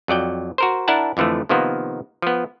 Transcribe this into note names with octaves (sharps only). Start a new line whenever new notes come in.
F2 F#3 D5 G5
F#4 A#4 C5
D4 E4 A#4 F#5 A5
F2 D3 E3 F3 A3
C3 D#3 F3 A#3 B3
F3 B3